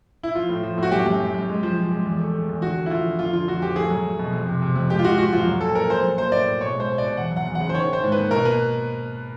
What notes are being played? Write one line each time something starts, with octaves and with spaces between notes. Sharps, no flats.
E4
F3 F4
A2
F3
A2 F#4
F#2 G4
F#2
F#2
F#2
G#3
F3
F3
G#3
E2
A3
A3
E2
D3 F#4
A3
E4
F3 F4
D3
F2 F4
D3 F4
F2 F#4
F2 G4
A3 G#4
F#3
F#3
B2
F2
C3
C3
F2
G#3 G4
F4
G#3 F#4
G#3 F#4
F2 F4
F#3
A#2 A4
A#2 A#4
A#2 C5
F#3
A#3 C5
A2 D5
A2
B2 C#5
G#3 C5
B2
D5
B2
E2 F#5
F#3 F#5
E2
F#5
C#3
C5
D#3 C#5
D#3 C5
G#2
A#3 B4
B2 A#4
A#3 B4